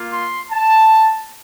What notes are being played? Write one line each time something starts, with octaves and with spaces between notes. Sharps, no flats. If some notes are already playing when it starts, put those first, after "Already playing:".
Already playing: A#3 F4
C6
A5